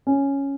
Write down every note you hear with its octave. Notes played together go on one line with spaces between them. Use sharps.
C#4